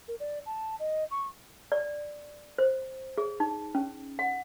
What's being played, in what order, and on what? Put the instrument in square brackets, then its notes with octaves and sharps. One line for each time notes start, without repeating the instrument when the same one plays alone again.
[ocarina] A#4
D5
A5
D#5
C#6
[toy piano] D5
C5
G#4
D#4
C#4
F#5